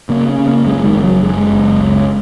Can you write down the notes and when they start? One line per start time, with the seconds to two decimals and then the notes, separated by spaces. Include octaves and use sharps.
0.09 C#3 A#3
0.29 C#4
0.38 C#3
0.48 A#3
0.66 F#1 G#3
0.85 D#3
0.95 F#1
1.04 F#3
1.22 F#2 G#3
1.51 F#1
1.80 C#2